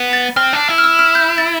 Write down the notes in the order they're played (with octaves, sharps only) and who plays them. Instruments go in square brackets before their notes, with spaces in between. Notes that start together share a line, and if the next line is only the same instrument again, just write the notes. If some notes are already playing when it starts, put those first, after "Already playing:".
Already playing: [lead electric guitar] B3
[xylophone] A6
[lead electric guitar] C4 [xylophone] F6
[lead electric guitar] D4
E4
[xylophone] F6
E6
F6
G6
A6